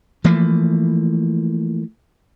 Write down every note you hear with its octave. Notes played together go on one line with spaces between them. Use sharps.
E3 F3 A3 A#3